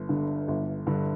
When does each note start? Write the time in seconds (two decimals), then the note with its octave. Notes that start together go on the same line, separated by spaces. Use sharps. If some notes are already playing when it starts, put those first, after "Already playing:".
Already playing: G1
0.09 G2 D3
0.48 G1
0.87 G2 D3